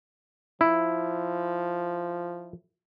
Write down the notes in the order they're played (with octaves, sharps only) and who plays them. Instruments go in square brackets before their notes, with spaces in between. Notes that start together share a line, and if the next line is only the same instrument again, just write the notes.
[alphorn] F3 [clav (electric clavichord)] E4